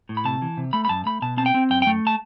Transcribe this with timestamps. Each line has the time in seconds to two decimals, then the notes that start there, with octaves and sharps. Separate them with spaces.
0.09 A2
0.17 B5
0.25 C3 A5
0.42 E3
0.57 C3
0.73 A3 B5
0.85 B5
0.89 F#2 A5
1.06 A3 B5
1.22 B2 A5
1.37 C4 A5
1.46 G5
1.54 C4
1.70 F#2 G5
1.82 G5
1.87 A3
2.07 A5